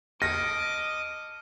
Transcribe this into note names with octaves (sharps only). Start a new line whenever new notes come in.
D#5 A5 D6 F6 A#6 C#7